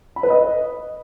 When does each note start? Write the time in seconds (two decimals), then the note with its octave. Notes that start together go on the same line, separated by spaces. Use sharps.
0.16 B5
0.23 B4
0.30 D#5